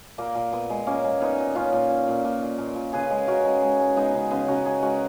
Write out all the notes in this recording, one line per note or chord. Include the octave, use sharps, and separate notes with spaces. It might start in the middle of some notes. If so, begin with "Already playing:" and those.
A#2 A#3
A#2
A#2 B3
G#3
A#2 A#3 C#4
G#3
A#2 B3 D#4
A#2
A#2 C#4 F4
A#2
A#2
A#2
A#2
A#2
A#2
A#2
C#3 G#4 B4
G#3
C#3 F#4 A#4
G#3
G#3
G#3
G#3 B3 D#4
C#3
C#3 B3
C#3 F#4 A#4
G#3 G#4 B4
G#3 F#4 A#4